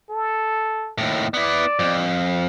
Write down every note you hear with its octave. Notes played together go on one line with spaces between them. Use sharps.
A4
D#2 A2
B3 E4 D5
F2